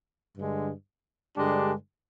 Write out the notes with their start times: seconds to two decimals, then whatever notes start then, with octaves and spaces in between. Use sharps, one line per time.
0.35 G2 D3 G#3
1.37 G2 D3 G#3 D4 G4